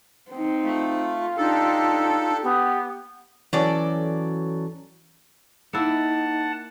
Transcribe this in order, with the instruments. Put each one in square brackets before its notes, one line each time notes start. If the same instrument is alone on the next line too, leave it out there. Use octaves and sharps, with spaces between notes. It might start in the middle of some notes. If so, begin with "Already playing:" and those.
[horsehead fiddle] C4 D#4
[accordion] A3 [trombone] F4
[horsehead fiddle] D4 G4 [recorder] D#4 [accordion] A4
[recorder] B3 [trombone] G4
[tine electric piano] E3 C#4 [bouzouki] F#3 A4 D5
[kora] A#3 E4 [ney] D#4 [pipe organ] F#5 A5